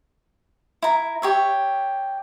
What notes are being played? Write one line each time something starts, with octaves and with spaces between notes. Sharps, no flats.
E4 A#5
G4 C#5 E5